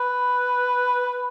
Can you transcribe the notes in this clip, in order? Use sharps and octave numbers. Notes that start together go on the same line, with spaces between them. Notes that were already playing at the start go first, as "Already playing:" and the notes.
Already playing: B4